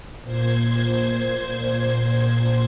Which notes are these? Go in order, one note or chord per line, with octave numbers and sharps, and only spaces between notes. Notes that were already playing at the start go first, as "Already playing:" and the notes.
A#2 C5 G#6